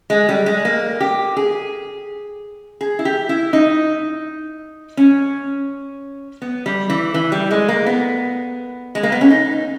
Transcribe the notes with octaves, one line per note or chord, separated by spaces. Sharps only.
G#3
G3
G#3
A#3
G4
G#4
G#4
E4
G4
E4
D#4
C#4
B3
G3
E3
E3
G3
G#3
A#3
B3
G#3
A#3
B3
C#4
D#4